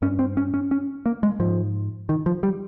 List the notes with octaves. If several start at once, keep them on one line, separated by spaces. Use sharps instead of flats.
G2 C#4
C4
C#4
C#4
C#4
A#3
G#3
G#2 F3
D#3
F3
G3